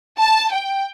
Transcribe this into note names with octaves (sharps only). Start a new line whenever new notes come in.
A5
G5